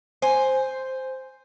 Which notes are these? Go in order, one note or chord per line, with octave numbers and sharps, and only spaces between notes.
C5 G#5